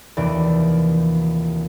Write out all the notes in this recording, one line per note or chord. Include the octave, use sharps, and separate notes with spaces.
F1 D#2 E3 D5